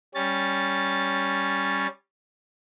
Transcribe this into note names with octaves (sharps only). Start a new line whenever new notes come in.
G3 C#4 A6